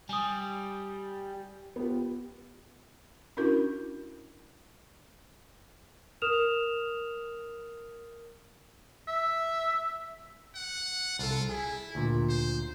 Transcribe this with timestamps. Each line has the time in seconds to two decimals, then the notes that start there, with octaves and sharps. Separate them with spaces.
0.09 G3 G#5 D#6
1.76 B3 F4 G4
3.37 C#4 D4 E4 F#4 A#4
6.22 A#4 D#6 F6 E7 F7
9.08 E5
10.55 F#5
11.19 C2 F4 A4
11.49 E4 G#4
11.95 D2 A#2
12.29 C5